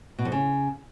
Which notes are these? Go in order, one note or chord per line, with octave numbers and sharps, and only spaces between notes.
B2
F2
C#3